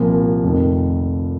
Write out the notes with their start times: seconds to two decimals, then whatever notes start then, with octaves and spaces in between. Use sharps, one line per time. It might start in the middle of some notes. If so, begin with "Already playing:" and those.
Already playing: C2 A#2 F3 A#3
0.43 F1 F2 D#3